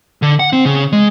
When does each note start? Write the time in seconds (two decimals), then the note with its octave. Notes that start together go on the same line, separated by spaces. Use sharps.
0.22 D3
0.40 F#5
0.53 C4
0.65 C#3
0.93 G#3